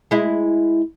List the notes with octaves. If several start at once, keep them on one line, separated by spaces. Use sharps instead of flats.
G#3 E4